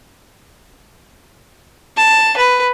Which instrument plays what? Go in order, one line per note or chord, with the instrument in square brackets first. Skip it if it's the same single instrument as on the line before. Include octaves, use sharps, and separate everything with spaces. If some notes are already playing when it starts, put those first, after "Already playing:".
[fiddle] A5
B4